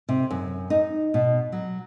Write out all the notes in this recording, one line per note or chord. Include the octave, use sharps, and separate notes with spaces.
C3
F#2
D#4
B2
F#3